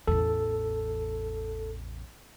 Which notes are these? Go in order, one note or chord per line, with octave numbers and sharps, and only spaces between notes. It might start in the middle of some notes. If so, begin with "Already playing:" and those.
A1 E2 A4